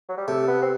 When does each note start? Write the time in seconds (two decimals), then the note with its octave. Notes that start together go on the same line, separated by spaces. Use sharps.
0.09 F#3
0.18 G3
0.28 C3 A3
0.48 B3
0.62 C4